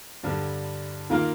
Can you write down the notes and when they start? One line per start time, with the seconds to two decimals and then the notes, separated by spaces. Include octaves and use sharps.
0.23 G2 D3 G3
1.10 D#3 A#3 F4 A#4